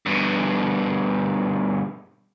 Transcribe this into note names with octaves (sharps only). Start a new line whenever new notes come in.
G2 B2